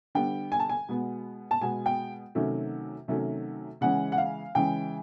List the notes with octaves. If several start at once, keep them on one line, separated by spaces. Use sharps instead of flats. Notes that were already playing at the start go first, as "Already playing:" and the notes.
D3 G3 B3 G5
G#5
A5
G#5
B2 G#3 B3
A5
B2 G#3 B3 G#5
G5
C3 D#3 F#3 A3 C#4
C3 D#3 F#3 A3 C#4
C#3 E3 G#3 C#4 F#5
F#5
F5
C#3 E3 G#3 C#4 G5